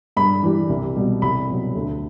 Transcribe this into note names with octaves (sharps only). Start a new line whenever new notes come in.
G2 B5
E3 G3
C2
B2 G3
C2 B5
B2 F#3
D2